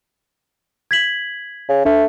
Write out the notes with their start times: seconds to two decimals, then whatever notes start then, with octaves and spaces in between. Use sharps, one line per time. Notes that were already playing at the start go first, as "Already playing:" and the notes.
0.91 G#6 B6 F#7
1.69 C#3
1.85 A3 D4